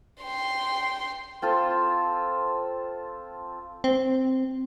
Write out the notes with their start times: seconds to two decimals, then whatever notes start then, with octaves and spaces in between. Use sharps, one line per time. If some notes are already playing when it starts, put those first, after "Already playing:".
0.23 G5 C6
1.42 C4 F4 A4
3.84 C4